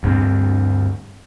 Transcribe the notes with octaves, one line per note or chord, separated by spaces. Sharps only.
D2 G2 B3 C4